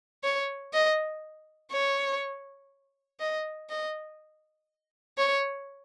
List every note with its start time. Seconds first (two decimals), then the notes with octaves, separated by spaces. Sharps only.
0.24 C#5
0.73 D#5
1.71 C#5
3.20 D#5
3.70 D#5
5.18 C#5